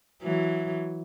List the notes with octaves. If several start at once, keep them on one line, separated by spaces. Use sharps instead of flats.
E3 F#3